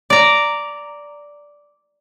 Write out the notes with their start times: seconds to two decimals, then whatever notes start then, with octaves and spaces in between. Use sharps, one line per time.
0.10 D5 A#5